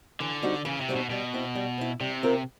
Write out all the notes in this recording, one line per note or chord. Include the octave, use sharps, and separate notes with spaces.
D3 E3
G3 C4 D#4 F#4
C#3 E3
C3
G3 C4 D#4 F#4
B2
B2 G3
C4 E4
G3
C4 E4
C3 G3
C4 F4 A#4